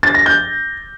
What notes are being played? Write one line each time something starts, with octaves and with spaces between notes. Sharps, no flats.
A6
A#6
G6